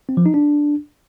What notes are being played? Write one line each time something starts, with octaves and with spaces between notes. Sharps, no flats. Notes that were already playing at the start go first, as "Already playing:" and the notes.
C4
F3
D#4
D4